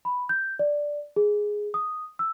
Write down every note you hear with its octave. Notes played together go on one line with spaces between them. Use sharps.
B5
G6
D5
G#4
D#6
E6